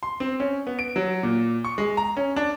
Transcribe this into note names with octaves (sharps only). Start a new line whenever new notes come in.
C6
C4
C#4
B3
D7
F#3
A#2
C#6
G#3
A#5
C#4
D4